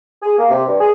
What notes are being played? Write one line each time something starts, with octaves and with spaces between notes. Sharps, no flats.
G#4
A#3
C3
G2
G#4